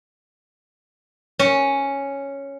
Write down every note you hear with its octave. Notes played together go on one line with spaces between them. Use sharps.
C#4